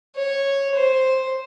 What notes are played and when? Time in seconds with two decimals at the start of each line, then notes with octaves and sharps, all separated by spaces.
0.16 C#5
0.75 C5